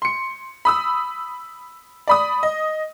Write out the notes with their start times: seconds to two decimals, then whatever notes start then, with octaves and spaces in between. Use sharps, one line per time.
0.02 C6 C#7
0.65 B5 D#6 E6
2.08 D5 B5 D#6
2.43 D#5